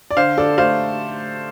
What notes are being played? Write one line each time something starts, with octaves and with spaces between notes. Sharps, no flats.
D5
D3 C5 F5
D3 A4 D5
A3 C5 F5